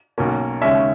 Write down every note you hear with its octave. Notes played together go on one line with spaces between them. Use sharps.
B1 B2 A#3 C#4
D#2 C#3 G#3 C#4 E5